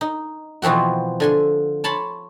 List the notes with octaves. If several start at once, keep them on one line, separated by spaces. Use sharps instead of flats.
D#4
B2 E3 F3 C4 F#4
D3 G#5 C6
C#5 A5 B5 C6